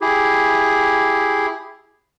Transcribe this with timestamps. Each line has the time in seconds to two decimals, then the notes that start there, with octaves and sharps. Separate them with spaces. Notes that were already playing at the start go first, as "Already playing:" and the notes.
0.01 E4 G4 G#4